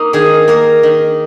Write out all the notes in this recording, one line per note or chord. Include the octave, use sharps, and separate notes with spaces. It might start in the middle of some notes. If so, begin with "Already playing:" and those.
Already playing: A#3 D#4
D#3 G#4
A#3 A#4
D#3